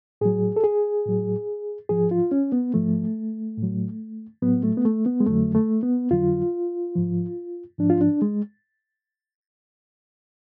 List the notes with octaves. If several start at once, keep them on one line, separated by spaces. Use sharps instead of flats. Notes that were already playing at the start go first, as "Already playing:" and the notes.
A2 F#3 G#4
A4
G#4
A2 F#3
G#2 F3 G#4
F4
C#4
B3
G#2 F3 A3
A2
F#3
A2 F#3 B3
A3
B3
A3
B3
G#3
F2 D3 F#3 A3
A3
B3
F2 D3 F#3 F4
G#2 F3
G#2 F3 D4
F4
D4
G#3